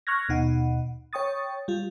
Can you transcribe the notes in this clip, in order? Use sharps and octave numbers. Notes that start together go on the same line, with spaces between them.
C#6 F6 F#6 G#6 A#6
D#2 B2 D#4 F#5
C#5 G5 C#6 D#6 A6
G3 F4